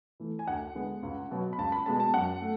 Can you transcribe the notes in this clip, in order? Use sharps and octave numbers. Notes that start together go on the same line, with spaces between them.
E3 A3
G#5
D2 F#5
D3 G#3 B3
C#2
B2 F#3 B3
B5
C#2 A5
B5
B2 G#3 B3 A5
A5
F#2 F#5
A3